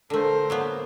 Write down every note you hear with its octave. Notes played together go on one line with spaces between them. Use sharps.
D3 A3 A#4 C5
F#3 A#3 B3